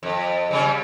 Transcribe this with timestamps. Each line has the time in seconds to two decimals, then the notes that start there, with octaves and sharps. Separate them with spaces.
0.03 F2
0.51 C#3 G3 C#4